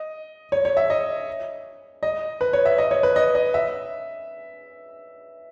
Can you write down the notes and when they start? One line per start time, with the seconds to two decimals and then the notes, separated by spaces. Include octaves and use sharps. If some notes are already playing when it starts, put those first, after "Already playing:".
Already playing: D#5
0.52 C#5
0.65 C#5
0.77 E5
0.90 D#5
2.03 D#5
2.41 B4
2.53 C#5
2.65 E5
2.78 D#5
2.91 C#5
3.03 B4
3.16 D#5
3.35 D#5
3.54 E5